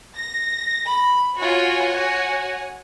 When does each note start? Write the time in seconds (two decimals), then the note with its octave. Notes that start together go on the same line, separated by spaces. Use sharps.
0.16 A#6
0.85 B5
1.38 F4 F#4 C#5 F#5 G#5
1.92 F#4